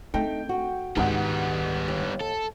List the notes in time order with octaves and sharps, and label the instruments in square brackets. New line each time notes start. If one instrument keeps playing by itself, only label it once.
[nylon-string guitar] A3 D#4 [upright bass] C4 D4 [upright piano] G5
[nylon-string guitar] F#4
[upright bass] C#2 D#3 [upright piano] G#2 F#5 [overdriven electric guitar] G3 B3
[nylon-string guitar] D#2
[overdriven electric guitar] A4